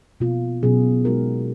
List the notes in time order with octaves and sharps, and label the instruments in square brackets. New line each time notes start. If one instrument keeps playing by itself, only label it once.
[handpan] B2 A#3 F4
B2 F#3 C#4 G#4
G#3 D#4 F#4 A#4